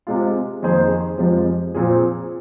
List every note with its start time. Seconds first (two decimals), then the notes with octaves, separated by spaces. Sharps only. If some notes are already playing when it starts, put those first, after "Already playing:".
0.07 C3 G#3 F4
0.63 F2 D#3 A#3 G#4 C5
1.18 F2 C3 F3 G#3 F4
1.75 A#2 F3 C4 G#4